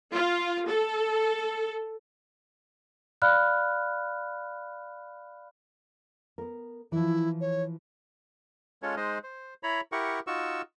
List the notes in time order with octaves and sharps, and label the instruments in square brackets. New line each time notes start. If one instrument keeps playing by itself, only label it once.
[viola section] F4
A4
[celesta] D5 F5 B5 F6 F#6
[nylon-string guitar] B3 A#4
[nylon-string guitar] E3 F3 [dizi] E4
[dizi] C#5
[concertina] G#3 C#4 F4 A4 C#5
G#3 D#4 C5 D#5
C5
E4 C#5 A#5 B5
E4 G4 A#4 F#5 C#6
D#4 F4 F#4 C#6 E6